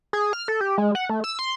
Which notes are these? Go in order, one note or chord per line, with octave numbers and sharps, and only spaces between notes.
G#4
F6
A4
G4
G#3
F#5
A3
E6
C6